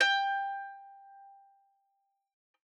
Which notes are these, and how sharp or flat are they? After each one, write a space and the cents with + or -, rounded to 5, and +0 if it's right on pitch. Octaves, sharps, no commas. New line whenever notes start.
G5 +15